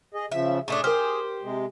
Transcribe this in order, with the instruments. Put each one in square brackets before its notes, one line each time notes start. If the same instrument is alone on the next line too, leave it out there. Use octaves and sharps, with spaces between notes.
[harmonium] G#4 D#5
[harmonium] C#3 F3 [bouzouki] E5
[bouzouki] A2 A3 D4 [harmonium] G#4
[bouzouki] G4 C5 [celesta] A#4 F6
[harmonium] C3 G#3